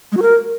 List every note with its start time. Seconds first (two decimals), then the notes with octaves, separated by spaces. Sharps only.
0.12 G#3
0.17 F#4
0.22 A#4